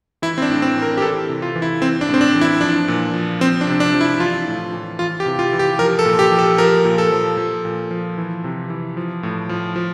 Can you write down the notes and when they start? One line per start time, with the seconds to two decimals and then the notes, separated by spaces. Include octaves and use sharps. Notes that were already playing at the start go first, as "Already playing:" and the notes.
0.22 E3 E4
0.38 C4
0.42 D4
0.50 A2
0.62 C4
0.76 E3
0.82 A#4
0.97 G4
1.02 E3 A4
1.29 C3
1.42 F4
1.56 E3
1.62 E4
1.81 E3 C4
2.01 D4
2.09 A2
2.14 C4
2.21 D4
2.35 E3
2.41 E4
2.61 F3 D4
2.88 A#2
3.14 F3
3.41 F3 C4
3.61 D4
3.67 C3
3.80 D4
3.94 F3
4.01 E4
4.15 E4
4.20 E3 F4
4.47 A2
4.73 E3
4.99 E3 F4
5.20 G4
5.26 C3
5.39 F4
5.53 E3
5.59 G4
5.79 F3 A#4
5.99 A4
6.05 A#2
6.19 G4
6.32 F3
6.39 A4
6.58 F3 A#4
6.85 A#2
6.98 A4
7.12 F3
7.37 F3
7.65 A#2
7.91 F3
8.18 E3
8.44 C3
8.70 E3
8.97 F3
9.23 A2
9.49 F3
9.76 F3